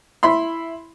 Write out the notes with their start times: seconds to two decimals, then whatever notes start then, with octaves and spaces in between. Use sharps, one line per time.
0.23 E4 B5 C6